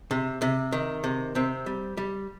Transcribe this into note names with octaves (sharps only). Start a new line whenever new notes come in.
C3
C3
D#3
C3
C3 C4
G3
G3